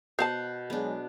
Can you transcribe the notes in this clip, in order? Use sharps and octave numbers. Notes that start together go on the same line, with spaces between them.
B2 C5 F5 F#5 A5 G6 C7
F#3 G#3 B3 D4 G#4